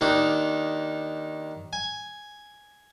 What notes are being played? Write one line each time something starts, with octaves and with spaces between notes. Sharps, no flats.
D#2 D#3 D4 D#4
G#5